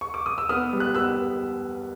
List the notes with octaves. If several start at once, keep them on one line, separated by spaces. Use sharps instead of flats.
C#6
D6
D#6
E6
B3 D#6 F6
G3
F#6
B3 E6 F#6